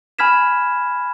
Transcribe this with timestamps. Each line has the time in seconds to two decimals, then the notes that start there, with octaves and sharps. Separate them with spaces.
0.19 G#5 B5 F6 G#6 B6 E7